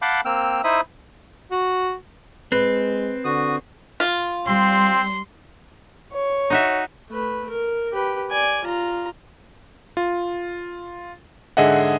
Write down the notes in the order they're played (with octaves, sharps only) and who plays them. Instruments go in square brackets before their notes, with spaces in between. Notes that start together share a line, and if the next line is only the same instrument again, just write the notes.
[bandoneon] F5 F#5 A5 B5 D6 G6
A#3 C4 G5 E6 F6
D#4 E4 C5 E5 B5 D#6
[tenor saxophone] F#4
[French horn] G#3 [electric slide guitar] C4 [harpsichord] B4
[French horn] D3 [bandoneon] F#4 D#6
[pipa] F4
[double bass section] G3 [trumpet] C4 [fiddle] C6
[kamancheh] C#5
[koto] D#4 F#4 E5
[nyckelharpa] A3 B4
A#4
G4 B4
D5 G#5
F4 A#5
[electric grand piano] F4
G#2 D3 G#4 D#5 E5 F#5